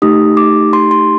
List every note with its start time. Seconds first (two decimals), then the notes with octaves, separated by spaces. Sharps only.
0.02 A3 D#4 G4 D#6
0.37 D6
0.73 C6
0.91 C6